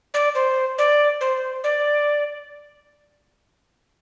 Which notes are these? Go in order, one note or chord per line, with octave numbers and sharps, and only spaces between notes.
D5
C5
D5
C5
D5